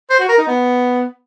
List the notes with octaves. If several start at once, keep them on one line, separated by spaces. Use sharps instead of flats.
C5
F#4
A#4
D#4
B3